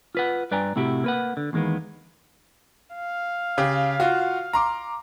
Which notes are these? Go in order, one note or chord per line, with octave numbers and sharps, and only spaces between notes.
F4 B4 F#5
G2 B4 D5 G5 G#5 A#5
A2 C3 E4 F#4 G4
A#3 B4 F#5
D3
E2 D#3 G#3 A#3 B3
F5
C#3 G4
F4 F#4
A#5 C6 D6